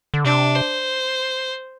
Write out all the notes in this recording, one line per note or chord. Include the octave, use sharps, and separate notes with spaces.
D3
C3 D4
C5